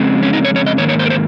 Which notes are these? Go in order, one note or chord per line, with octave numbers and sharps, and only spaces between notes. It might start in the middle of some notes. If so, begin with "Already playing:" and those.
Already playing: F2 C#3 G#3 C4
C#4
D#4
C#5
C#5
D#5
G#2 D#3 A#3 C#5
C#5
C5
A#4
C5